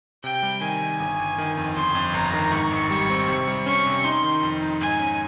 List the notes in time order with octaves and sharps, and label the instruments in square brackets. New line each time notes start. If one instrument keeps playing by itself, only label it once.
[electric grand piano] C3 [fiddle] G5
[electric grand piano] G3
[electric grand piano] D#3 [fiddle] G#5
[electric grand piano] D#3
G1
G1
D#3
F2
[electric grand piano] G1 [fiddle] C6
[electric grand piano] F2
[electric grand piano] G1 [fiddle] A#5
[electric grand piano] D#3
[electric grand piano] G#2 [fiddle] C#6
[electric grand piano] G#1
G3
C4
C3
G3
[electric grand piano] C#4 [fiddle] C#6
[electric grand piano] C3
[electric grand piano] D#4 [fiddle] C6
[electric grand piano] D#3
F2
D#4
[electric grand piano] G#2 [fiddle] G#5
[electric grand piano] C#4